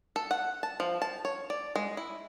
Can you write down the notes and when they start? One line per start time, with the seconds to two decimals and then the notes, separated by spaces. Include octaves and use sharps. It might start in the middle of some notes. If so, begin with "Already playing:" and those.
0.16 A4
0.31 F#5
0.63 A5
0.80 F3
1.02 A5
1.25 C#5
1.50 D5
1.76 G#3
1.97 E4